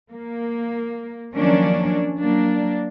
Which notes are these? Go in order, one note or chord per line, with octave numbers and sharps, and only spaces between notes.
A#3
D#3 F3 F#3 A#3 C#4 D4
F#3 A#3 D4